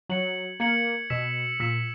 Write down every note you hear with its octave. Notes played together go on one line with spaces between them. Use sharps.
F#3 G#6 C#7 F#7
A#3 G#6 C#7 F#7
B2 E6 B6 E7
A#2 E6 B6 E7